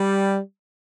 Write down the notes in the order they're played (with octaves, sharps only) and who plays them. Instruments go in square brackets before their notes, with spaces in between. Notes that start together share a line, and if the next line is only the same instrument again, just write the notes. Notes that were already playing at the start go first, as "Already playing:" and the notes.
Already playing: [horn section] G3